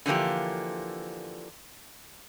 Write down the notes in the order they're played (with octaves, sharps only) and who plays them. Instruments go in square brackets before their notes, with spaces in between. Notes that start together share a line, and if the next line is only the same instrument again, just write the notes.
[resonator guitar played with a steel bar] D3 E3 F3 A#3 G4